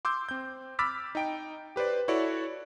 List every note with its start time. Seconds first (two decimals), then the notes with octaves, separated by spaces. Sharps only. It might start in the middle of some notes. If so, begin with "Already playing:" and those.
0.05 C6 D6 E6 G6
0.29 C4 G6
0.79 B5 D6 E6 F6 A6 B6
1.15 D#4 G5 D7
1.76 G4 B4 C5 D5
2.08 E4 F#4 A4 C#5 D5